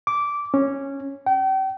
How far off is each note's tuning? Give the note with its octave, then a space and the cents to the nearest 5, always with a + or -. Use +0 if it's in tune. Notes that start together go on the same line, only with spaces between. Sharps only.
D6 -10
C#4 -10
G5 -40